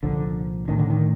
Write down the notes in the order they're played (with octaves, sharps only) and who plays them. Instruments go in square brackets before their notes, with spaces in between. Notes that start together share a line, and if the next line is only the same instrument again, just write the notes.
[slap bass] C2 A#2 F3 [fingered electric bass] D3
[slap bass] A2 A3 D4 [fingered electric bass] D#3
[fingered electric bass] D3
D#3